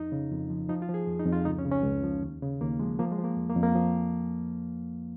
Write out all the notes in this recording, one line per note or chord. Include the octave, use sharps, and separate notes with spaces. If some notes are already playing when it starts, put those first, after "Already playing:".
Already playing: F2 D#4
C#3
F2
F3
F3 D#4
F4
F3
G#4
F2
D#4
F2
F4
C#2 D#4
C#4
C#3
C#4
C#2
F3
D#2
C#3
D#2 A#3
F3 G#3
F3 A#3
G#3
F3
A#3
F2
A#3
F2
A#3
F3